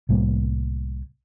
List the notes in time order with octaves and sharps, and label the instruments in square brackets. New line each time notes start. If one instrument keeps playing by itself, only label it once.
[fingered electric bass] C2 A2 G3 A#3